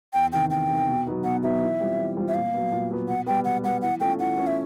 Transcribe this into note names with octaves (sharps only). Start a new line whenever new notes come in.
E2 G5
C3 D#3 G5
E2 G5
C3 D#3
B2
F#3 B3 D#4
B2 F#5
F#3 B3 D#4 E5
E3
G3 C4 F4
E3
G3 C4 F4
E5
A#2 F5
F#3 B3
A#2
F#3 B3
B2 F#5
G3 B3 G5
B2 F#5
G3 B3 F#5
E3 F#5
A3 C#4 F4 G5
E3 F#5
A3 C#4 F4
E5